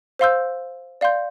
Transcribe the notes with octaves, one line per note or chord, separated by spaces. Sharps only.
C5 F5 C6 E6 G6
D5 F5 C6 G6